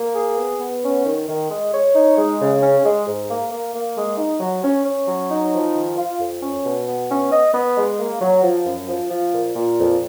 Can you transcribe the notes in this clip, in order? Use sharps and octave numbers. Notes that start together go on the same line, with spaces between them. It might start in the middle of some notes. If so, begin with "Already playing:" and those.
Already playing: A#3
G#4
B3
B3
C#4
D#3
D#3
G#3
C#5
D#4
G#3
C#3
C#4
G#3
G#2
A#3
A#3
A#3
G#3
D#4
F#3
C#4
C#4
F#3
D#4
F3
D#3
F4
F2
C#4
B2
B3
C#4
D#5
B3
G#3
A#3
F#3
F3
F#2
F3
F3
A#2
A#2
F2